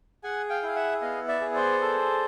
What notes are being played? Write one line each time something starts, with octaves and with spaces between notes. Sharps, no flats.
G#4 F#5 G#5
F5 G5
E4 F5
E5 F#5
B3 D#5 F5
D5 E5
G#4
C5 D5
A4